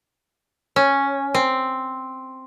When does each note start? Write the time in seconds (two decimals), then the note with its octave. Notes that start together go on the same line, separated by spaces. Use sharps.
0.76 C#4
1.34 C4